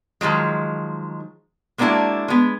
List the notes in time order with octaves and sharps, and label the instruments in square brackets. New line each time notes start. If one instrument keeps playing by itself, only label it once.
[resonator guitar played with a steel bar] D#3 F3 F#3 G#3
G#3 A#3 B3 D4 E4 F#4
G#3 B3